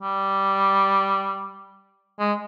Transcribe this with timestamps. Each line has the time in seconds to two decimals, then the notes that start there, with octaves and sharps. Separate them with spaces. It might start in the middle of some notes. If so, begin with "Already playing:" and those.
0.02 G3
2.20 G#3